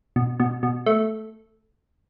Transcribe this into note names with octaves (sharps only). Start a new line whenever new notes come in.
B2
B2
B2
A3